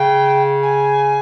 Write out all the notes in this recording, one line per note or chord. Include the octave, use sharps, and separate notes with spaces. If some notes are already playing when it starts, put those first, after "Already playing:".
Already playing: C#3 G5
G#5